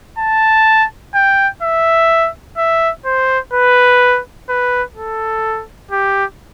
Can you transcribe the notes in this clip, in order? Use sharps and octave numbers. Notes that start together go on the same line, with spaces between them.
A5
G5
E5
E5
C5
B4
B4
A4
G4